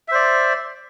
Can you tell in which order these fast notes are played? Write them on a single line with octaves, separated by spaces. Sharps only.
E5 C5 D5